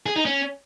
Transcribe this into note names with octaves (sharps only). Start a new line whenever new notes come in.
G#4
D#4
C#4